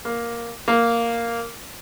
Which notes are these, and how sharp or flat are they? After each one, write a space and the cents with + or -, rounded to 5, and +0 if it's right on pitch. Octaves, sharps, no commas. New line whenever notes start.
A#3 +5
A#3 -5